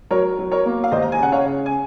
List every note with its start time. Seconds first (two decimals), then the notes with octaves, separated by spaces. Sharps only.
0.11 F#3 A#4 C#5
0.39 F#3
0.51 A#4 C#5
0.66 A#3
0.84 F5
0.91 D#2 C5 D#5
1.02 A#5
1.12 G#5
1.19 C#3 F#5
1.32 C#5 F5
1.45 C#3
1.66 G#5